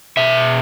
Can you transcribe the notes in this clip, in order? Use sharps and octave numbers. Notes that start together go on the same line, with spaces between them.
B2 E5